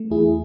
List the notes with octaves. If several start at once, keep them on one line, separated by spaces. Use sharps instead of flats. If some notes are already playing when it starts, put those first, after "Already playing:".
Already playing: A3
E2 E4 G#4